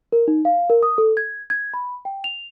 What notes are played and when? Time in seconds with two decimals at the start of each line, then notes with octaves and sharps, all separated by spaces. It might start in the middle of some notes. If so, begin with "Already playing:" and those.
0.12 A#4
0.28 D#4
0.45 F5
0.70 A#4
0.83 D#6
0.98 A4
1.17 G#6
1.50 G#6
1.74 B5
2.05 G5
2.24 F7